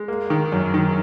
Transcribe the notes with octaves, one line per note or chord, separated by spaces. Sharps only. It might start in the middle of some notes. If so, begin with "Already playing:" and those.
Already playing: G#3
A#3
D#3
F#2
D#3